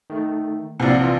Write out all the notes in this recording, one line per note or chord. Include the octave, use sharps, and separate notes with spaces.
D#3 A3
A#1 C3 D5 F5 F#5
E3 F4